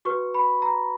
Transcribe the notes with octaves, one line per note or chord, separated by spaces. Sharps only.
F#4 B4 C#6
B5
A#5